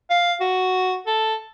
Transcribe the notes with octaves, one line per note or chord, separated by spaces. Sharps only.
F5
F#4
A4